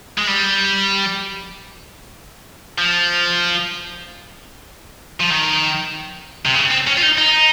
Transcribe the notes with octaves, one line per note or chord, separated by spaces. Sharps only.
G#3
G3
F3
F3
D#3
C3
C#3
C4
C#4
F4
D#4
D#4